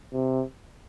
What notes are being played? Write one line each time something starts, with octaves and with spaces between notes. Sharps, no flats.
C3